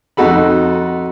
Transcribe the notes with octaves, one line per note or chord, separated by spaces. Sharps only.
F2 D#4 F#4 A4 B5